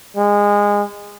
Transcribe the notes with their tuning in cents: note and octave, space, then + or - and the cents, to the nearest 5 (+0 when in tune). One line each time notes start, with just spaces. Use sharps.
G#3 -20